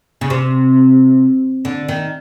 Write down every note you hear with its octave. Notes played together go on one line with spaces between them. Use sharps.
C#3
C3
D3
D#3